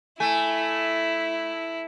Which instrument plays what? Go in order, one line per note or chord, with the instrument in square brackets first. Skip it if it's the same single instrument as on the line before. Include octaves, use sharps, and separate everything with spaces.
[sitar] A3 [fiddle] E4 [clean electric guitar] G#5